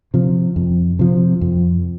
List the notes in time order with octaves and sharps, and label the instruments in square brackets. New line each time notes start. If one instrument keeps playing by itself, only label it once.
[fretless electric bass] C3 F3
F2
C3 F3
F2